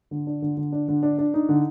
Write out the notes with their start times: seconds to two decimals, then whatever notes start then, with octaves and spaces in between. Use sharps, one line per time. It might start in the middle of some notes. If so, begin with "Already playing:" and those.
0.11 D3
0.27 D4
0.42 D3
0.57 D3
0.72 D4
0.88 D3
1.03 D4
1.18 D4
1.34 D#4
1.49 D3